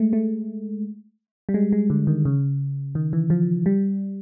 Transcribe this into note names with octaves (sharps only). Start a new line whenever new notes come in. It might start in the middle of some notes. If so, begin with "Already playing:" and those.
Already playing: G#3 A3
A3
G3
G#3
G#3
D3
D#3
C#3
D#3
E3
F3
G3